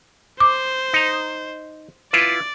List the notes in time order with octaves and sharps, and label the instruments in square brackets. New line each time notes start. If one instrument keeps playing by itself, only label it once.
[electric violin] C5 [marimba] D6
[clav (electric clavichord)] D#4 A#5
[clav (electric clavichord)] E4 F4 B4 [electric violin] D5